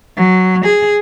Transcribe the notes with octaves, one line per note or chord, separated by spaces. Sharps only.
F#3
G#4